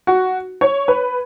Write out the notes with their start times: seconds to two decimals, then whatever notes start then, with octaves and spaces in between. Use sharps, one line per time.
0.07 F#4
0.61 C#5
0.88 B4